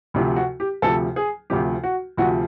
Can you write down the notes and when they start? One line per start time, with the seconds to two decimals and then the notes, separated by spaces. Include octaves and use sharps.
0.14 D2 C3 F3
0.36 F#4
0.60 G4
0.82 D2 C3 F3 A4
1.16 G#4
1.50 D2 C3 F3 G4
1.83 F#4
2.17 D2 C3 F3 F#4